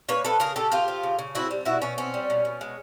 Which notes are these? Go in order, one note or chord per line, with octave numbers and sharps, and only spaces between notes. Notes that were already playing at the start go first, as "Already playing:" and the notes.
A#3 B4 C#5
F3 A4 B4
C#3 G#4 A#4
C#3 G4 A4
A#3 F4 G4
F3
C#3
C#3
C4 E4 F#4
G3
B2 E4 F#4
B2 C#4
C4 C#4
G3
B2
B2
G#3